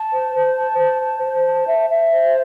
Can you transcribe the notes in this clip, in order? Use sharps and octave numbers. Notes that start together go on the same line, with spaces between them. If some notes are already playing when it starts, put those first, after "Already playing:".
Already playing: A5
C5
C5
A5
C5
A5
C5
A5
E5
E5
C5